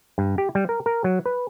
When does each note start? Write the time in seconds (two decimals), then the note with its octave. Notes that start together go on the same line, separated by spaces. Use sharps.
0.18 G2
0.38 G4
0.55 G3
0.69 A#4
0.86 A#4
1.04 F#3
1.26 B4